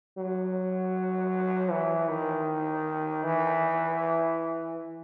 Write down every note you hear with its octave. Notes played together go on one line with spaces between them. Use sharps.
F#3
E3
D#3
E3